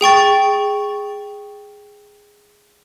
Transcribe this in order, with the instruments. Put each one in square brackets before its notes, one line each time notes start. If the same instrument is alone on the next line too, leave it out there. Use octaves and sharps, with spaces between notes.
[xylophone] G#4 G5 C#6 A6